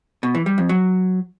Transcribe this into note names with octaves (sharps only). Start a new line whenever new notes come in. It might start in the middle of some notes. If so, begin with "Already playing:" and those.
B2
E3
G3
F2
F#3